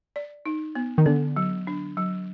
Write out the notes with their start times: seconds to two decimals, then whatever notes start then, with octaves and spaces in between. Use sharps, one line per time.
0.16 D5
0.46 D#4
0.75 B3
0.98 D#3
1.06 D3 B3
1.36 F#3
1.67 D4
1.97 F#3